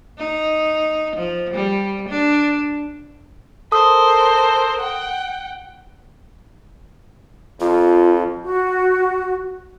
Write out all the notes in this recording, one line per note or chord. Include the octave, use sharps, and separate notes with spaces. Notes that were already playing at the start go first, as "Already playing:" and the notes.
D#4
F3
G3
D4
A4 A#4 C5 D#6
F#5 G5
F2 F4
F#4